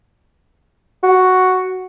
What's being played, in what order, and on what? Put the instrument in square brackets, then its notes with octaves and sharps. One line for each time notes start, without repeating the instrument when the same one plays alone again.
[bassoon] F#4